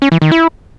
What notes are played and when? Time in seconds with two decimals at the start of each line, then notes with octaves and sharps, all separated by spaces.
0.02 C#4
0.12 E3
0.22 D#3
0.32 E4